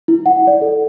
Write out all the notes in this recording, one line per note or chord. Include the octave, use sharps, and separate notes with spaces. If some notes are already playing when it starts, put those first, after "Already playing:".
E4
F#5
D5
A4